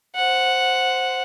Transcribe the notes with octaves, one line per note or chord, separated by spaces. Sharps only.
C5 F#5